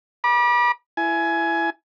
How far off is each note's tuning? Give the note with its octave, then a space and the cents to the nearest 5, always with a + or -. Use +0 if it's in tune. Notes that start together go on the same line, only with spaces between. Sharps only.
B5 -35 D6 +25
E4 +20 G#5 +20